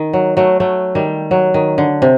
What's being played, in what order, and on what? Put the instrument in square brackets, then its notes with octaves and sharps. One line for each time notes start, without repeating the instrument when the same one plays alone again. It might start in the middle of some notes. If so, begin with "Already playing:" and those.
Already playing: [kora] D#3
F#3
F#3 A3
F#3 A3
D#3 G3
F#3
D#3
D3
C3